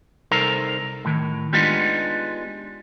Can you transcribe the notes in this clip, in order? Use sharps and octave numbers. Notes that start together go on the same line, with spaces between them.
C2 D#4 A4 A#4 C5 A#5
A2 D#3
G#3 B3 D4 D#4 F4 G4